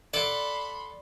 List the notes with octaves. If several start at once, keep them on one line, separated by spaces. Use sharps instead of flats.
A4 D5 F#5 A5 B5 C6